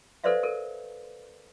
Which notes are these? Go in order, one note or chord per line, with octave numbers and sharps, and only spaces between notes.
A4 B4 C5 D5 E5 F5
A4 A#4